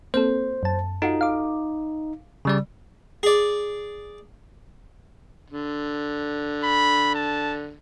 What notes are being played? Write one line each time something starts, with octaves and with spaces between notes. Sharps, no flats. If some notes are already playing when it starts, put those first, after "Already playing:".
A#3 C4 A4 C5
F#2 A5
D#4 F4 F#4 A4
F5 D6
C#3 G3 D5
G#4 D5
D3
B5
A5